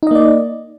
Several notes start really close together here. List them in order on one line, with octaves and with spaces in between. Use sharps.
D#4 D#5 A#3 D5